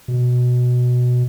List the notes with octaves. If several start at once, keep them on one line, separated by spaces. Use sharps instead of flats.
B2